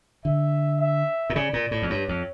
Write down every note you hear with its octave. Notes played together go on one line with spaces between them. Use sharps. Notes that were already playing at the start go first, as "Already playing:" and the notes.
D3 E5
E5
A#2
C#3 D5
A#2
A2
F2
G2 C#5
F2